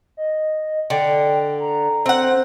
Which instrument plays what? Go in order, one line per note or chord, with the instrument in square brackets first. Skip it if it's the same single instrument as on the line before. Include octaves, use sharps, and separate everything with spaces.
[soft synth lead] D#5
[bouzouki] D3 [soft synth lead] G5
[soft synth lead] A#5
[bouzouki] C4 F#5 [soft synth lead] C5